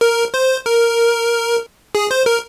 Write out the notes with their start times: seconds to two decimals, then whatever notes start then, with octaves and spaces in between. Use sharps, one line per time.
0.01 A#4
0.34 C5
0.66 A#4
1.95 G#4
2.11 C5
2.26 A#4